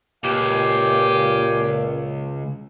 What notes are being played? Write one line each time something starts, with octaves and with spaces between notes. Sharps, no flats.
C#2 A#2 G4 F5 G#5